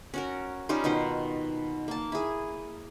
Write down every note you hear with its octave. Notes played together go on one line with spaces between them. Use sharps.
C#4 F#4 A#4
G3 C#4 D#4 F4
B2 D#3 F4 C5
A#3 A5
E4 G#4